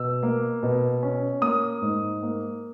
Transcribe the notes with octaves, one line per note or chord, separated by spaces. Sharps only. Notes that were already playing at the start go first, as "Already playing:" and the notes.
Already playing: B2 E6
A#3
B2
C#4
A#3 D#6
G#2
A#3